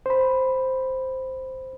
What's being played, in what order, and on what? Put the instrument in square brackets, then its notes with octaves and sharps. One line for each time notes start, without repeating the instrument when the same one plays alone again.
[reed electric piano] C5 B5